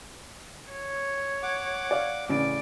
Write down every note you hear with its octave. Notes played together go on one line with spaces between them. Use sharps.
C#5
F#5 D6
D5 F5
A1 C#3 D5 D7